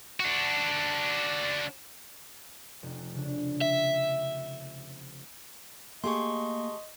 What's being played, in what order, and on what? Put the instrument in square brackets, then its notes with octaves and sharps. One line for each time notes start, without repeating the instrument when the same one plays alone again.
[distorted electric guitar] D4 F#4
[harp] F1
C#3 D4
[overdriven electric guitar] E5
[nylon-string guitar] A3 G4 G#4 [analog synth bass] A#3 [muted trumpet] D#5 [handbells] C6 C#6